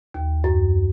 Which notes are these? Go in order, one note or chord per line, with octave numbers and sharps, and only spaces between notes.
D#2
F#2